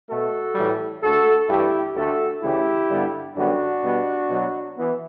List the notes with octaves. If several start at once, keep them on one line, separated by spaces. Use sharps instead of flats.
B2 A3 F#4 A4
A2 E3 G3
D2 D3 A3 F#4 A4
G2 E3 A3 E4 G4
D2 D3 A3 F#4 A4
D2 C#3 E3 A3 E4 G4
G2 D3 G3 B3
F#2 D3 G3 B3 D4 F#4
B2 G3 B3
B2 F#3 B3
E3 B3